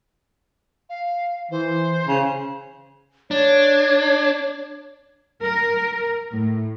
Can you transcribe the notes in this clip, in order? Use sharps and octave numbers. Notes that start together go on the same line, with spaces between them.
F5
E3 C5
C#3
D4 C#5
A#4
A2